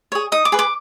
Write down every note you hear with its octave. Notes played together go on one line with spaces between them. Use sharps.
G#4 C#5
D#4 D#6
D6
G#4 B4
D6